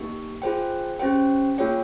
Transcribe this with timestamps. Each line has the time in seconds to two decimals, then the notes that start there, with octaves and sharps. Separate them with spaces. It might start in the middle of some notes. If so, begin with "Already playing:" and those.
Already playing: A#3 D#4 G4
0.42 F4 G#4 C5 G5
0.99 C#4 G4 C5 G5
1.58 A#3 F4 G#4 C#5 G5